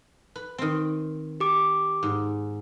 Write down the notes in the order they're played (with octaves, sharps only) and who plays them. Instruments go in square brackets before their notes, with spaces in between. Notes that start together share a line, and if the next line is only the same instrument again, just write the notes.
[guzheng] B4
D#3 C4
[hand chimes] G4 D6
[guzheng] G#2